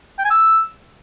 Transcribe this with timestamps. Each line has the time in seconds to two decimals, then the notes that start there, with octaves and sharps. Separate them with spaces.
0.19 G5
0.25 G#5
0.30 E6